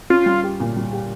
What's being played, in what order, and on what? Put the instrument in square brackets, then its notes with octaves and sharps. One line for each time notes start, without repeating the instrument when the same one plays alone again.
[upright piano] C#4 [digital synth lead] F4
[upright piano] G3
G4
A#2
G3
G4